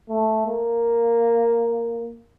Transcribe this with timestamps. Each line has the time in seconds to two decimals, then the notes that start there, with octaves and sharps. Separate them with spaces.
0.09 A3
0.46 A#3